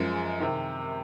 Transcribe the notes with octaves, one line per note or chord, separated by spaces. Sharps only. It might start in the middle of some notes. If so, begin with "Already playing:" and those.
Already playing: F#2 F3 G#3
C3 D#3